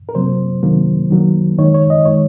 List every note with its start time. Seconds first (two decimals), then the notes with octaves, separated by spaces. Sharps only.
0.09 A#4
0.15 C3 F#3 A#3 C5
0.63 C3 D#3 F#3 A#3
1.11 D#3 F#3 A#3
1.58 D#3 G#3 C#5
1.74 C#5
1.90 D#5
2.06 D#3 G#3 C#5